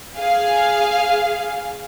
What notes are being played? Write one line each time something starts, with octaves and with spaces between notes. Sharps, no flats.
G#4 F5